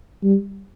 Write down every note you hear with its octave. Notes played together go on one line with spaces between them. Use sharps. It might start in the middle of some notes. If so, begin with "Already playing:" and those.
G3